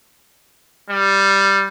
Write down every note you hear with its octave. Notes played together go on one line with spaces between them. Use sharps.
G3